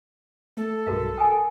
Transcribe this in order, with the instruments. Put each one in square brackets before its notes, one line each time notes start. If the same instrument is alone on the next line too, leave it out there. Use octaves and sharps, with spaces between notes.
[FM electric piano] A3 [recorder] A4
[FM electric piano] B1 G2 [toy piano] F#4 A#4 F5
[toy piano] G5 G#5 [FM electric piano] D#6